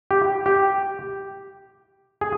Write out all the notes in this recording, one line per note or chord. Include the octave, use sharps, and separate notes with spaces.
G4
G4
G#4